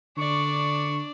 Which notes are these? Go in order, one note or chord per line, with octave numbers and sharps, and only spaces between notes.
D3 D4 D5 C#6